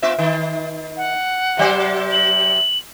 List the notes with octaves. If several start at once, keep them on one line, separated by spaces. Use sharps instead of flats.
B3 F4 E5
D#3
F#5
C3 F#3 C5
F#7